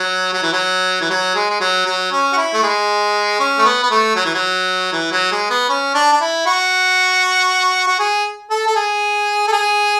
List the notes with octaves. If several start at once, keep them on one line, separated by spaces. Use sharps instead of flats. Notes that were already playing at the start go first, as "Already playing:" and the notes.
Already playing: F#3
F#3
E3
F#3
E3
F#3
G#3
G#3
F#3
F#3
C#4
F#4
E4
A3
G#3
C#4
A3
B3
B3
A3
F#3
E3
F#3
E3
F#3
G#3
B3
C#4
D4
D4
E4
F#4
F#4
G#4
A4
A4
G#4
A4
G#4